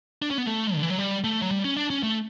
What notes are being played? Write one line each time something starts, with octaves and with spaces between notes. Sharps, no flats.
D4
C#4
B3
A3
D3
E3
F#3
G3
A3
F#3
G3
C#4
D4
C#4
A3